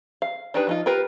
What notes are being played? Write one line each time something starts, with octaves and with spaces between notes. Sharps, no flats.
F5
D4 D#4 G4 G#4 B4
F3 D#4 F4
F4 G4 A#4 B4